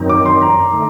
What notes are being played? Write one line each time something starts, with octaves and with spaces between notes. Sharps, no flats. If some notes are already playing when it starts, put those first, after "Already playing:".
Already playing: F#2 D#3 F#3 C4 D#4
D6
C6
A#5
D3 A3 D#4